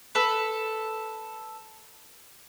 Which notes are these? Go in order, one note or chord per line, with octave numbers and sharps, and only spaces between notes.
A4 B4